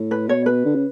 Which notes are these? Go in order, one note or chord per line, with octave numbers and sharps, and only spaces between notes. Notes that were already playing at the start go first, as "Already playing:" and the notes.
Already playing: A2
B4
B2 C#5
B4
D3
C#3